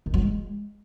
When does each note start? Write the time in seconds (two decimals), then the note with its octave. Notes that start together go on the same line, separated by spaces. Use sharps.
0.06 D#3
0.14 F#3
0.21 G#3